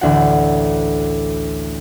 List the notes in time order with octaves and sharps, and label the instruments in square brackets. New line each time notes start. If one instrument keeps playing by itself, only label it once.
[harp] A1 D2 F#4 F#5